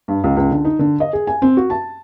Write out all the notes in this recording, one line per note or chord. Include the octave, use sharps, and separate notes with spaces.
G2
C#2
C#2
D3
D#4
D3
D#5
G#4
G#5
C4
F#4
A5